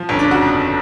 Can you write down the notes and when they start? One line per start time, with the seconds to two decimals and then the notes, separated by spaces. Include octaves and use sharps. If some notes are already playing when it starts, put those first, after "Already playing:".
Already playing: F3
0.09 G1 C#4
0.19 D4
0.25 C#3
0.31 F#4
0.42 F2